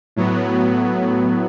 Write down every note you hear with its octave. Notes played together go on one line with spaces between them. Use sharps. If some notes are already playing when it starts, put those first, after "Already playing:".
A2 F#3 B3